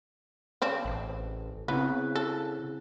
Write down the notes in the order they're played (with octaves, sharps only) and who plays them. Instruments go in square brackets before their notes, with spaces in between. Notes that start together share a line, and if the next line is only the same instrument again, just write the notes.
[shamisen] C#3 C4 D4
[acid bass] A1
[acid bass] C#3 [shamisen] B3 [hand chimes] C4 E4 F#6
[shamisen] A4